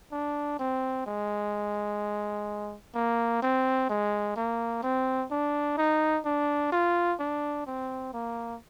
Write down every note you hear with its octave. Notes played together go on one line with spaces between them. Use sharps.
D4
C4
G#3
A#3
C4
G#3
A#3
C4
D4
D#4
D4
F4
D4
C4
A#3